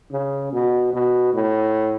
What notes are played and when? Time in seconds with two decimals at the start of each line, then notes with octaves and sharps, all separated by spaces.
0.12 C#3
0.53 B2
0.93 B2
1.33 A2